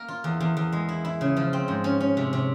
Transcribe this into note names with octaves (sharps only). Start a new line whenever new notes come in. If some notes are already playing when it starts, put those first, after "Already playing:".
Already playing: A#3 A#4
F4
E2
E2
E2
G#3
E4
E4
C#3
F3
C4
G#2
C#4
C#4
C3
C3